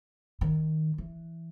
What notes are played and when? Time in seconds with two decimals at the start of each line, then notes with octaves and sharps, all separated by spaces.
0.41 D#3
0.98 E3